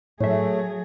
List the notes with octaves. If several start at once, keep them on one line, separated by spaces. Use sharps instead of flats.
A2 F#3 A3 G#4 C#5 E5